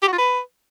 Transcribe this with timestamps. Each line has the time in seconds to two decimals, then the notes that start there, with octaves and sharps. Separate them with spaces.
0.02 G4
0.07 F#4
0.13 F4
0.18 B4